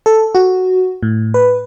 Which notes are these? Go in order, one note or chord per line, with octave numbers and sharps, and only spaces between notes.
A4
F#4
A2
B4